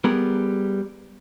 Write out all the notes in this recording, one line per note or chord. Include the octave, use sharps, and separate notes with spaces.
G3 B3 G#4 A#4